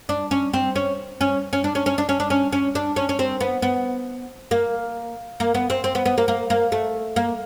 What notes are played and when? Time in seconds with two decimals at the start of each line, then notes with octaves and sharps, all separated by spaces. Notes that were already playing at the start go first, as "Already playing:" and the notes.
0.09 D4
0.31 C#4
0.53 C4
0.76 C#4
1.21 C#4
1.53 C#4
1.64 D4
1.75 C#4
1.86 C#4
1.98 D4
2.09 C#4
2.20 D4
2.30 C#4
2.52 C#4
2.75 D4
2.96 C#4
3.09 C#4
3.19 C4
3.41 B3
3.62 B3
4.51 A#3
5.40 A#3
5.55 B3
5.70 C4
5.84 C4
5.95 B3
6.06 B3
6.18 A#3
6.28 A#3
6.50 A#3
6.72 A3
7.16 A#3